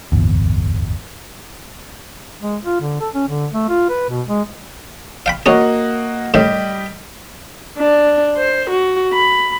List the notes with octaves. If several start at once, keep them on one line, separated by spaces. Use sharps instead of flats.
D1 G1 E2
G#3
F4
D3
A4
C#4
D3
A3
F4
B4
B2
G#3
F5 G5 B5
A#3 C#4 F#4 G#4 D#5
A2 D#3 G3 G4 D#5
D4
C5
F#4
B5